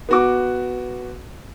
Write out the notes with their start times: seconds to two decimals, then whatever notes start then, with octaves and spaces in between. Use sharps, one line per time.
0.09 B3 F#4 D6